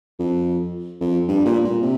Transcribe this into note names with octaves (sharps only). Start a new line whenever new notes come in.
F2
F2
G2
A#2
A#2
C3